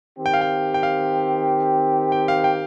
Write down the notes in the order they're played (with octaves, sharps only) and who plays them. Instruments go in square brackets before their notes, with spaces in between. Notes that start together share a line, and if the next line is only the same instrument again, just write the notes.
[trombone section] D#3 C4 G4
[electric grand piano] G5
F5
G5
G5
F5
G5
F5
G5